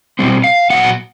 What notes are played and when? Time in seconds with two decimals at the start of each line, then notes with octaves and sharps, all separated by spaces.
0.19 B2 G3 C4
0.44 F5
0.70 A#2 F#3 B3 F#5